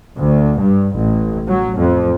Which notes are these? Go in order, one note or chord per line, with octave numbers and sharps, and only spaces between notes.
D2
G2
A1
F#3
F2